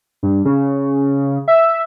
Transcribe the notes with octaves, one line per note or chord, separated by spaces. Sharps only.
G2
C#3
E5